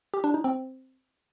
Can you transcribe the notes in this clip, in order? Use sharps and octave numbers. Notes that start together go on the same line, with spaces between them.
G4
D4
D#4
C4